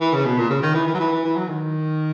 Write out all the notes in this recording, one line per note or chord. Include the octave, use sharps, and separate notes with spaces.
E3
C#3
B2
A#2
C#3
D#3
E3
E3
F#3
E3
E3
E3
F#3
D#3